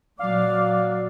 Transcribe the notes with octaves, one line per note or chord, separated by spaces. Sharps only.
A#2 F#3 D5 F5 D6